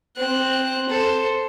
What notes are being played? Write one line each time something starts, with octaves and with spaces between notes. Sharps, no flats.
C4 F#6
A4 C5